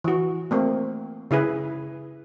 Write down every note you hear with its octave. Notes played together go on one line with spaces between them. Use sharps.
E3 F#4
A3 A#3 C4
C#3 E4 G#4 B4